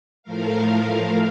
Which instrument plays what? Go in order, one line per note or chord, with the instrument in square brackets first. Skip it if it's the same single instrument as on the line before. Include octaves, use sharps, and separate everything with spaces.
[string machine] A2 F3 A3 A#4 F5